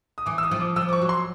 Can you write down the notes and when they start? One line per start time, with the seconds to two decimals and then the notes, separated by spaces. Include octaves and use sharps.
0.18 D#6
0.26 E3 D6
0.38 E6
0.43 D#6
0.51 F3
0.60 D6
0.76 F3 E6
0.89 D6
0.93 C#6
1.02 F#3
1.09 C6